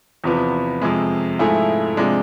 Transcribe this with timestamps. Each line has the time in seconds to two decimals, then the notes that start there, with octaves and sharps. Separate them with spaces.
0.24 E2 C3 F3 B3
0.82 F2 C3 G#3
1.39 G#2 F3 A3 E4 G#4
1.97 C3 F3 G#3 D4